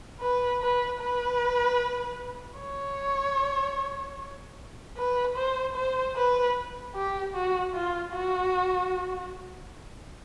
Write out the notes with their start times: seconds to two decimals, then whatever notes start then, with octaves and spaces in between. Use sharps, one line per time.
0.21 B4
0.62 B4
1.01 B4
2.59 C#5
4.97 B4
5.36 C5
5.75 C5
6.16 B4
6.95 G4
7.34 F#4
7.74 F4
8.14 F#4